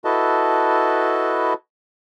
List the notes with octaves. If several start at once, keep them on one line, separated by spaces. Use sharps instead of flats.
E4 F#4 A4 B4 D#5 A5